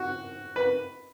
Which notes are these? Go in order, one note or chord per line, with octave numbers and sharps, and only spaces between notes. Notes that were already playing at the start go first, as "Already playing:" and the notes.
Already playing: F#4
B4